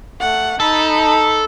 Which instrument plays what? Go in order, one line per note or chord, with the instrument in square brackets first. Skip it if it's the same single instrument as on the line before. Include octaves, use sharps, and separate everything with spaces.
[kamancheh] A3 F#5
[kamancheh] D#4 B5 [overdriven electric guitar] A4